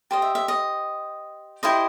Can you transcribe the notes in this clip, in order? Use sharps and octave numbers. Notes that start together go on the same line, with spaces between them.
G4 C5 D#5
E5
E5
D#5
E4 G4 C5 D#5